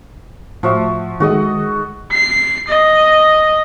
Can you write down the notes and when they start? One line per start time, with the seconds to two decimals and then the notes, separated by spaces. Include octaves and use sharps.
0.63 A2 F3 F#4 E5
1.20 D#3 G#3 F#4 A4 D#5
2.12 C7
2.68 D#5